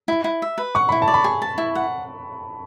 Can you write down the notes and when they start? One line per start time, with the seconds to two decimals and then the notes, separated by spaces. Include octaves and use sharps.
0.08 E4
0.24 E4
0.42 E5
0.58 B4
0.75 F#5 C#6
0.89 E4 B5
1.02 A5
1.08 D5
1.14 B5
1.24 G#4
1.42 A5
1.58 E4
1.75 F#5